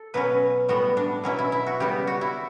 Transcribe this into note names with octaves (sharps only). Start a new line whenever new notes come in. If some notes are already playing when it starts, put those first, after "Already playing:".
Already playing: A4
B2 F#3 C#4 B4
A2 G3 B3 F#4
D4
B2 F#3 C#4 E4
E4
E4
F#4
C#3 G3 B3 G4
F#4
E4